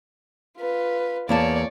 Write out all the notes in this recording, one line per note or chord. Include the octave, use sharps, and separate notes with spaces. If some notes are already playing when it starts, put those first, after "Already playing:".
F4 B4
E2 A#3 C#5 D5 A5